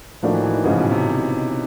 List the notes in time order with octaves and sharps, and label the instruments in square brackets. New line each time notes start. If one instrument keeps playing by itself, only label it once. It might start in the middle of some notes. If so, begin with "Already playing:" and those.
[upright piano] A2 F3 A#3 D4 F#4 [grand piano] D#3
[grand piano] E3
E3
D#3
[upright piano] A1 G#2 F3 [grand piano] C#3
[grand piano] B2
C3